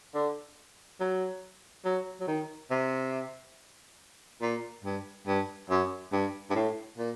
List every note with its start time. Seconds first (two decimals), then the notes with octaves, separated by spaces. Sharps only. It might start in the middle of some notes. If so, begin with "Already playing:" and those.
0.15 D3
1.00 F#3
1.85 F#3
2.21 F#3
2.28 D#3
2.71 C3
4.42 A#2
4.85 G2
5.27 G2
5.70 F#2
6.13 G2
6.50 G2
6.55 A2
6.98 A#2